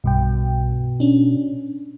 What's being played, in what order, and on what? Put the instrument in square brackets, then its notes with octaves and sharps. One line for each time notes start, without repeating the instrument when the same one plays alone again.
[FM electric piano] B1 G2 G5 [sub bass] B2
[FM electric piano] C#4 D4